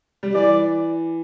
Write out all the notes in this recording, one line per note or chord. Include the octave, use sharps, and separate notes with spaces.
G3
E3 D5